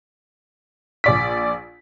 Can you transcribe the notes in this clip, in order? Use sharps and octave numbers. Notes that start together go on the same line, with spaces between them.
A#1 D5 B6